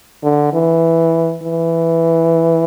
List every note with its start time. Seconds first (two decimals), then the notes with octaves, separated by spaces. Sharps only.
0.23 D3
0.53 E3
1.42 E3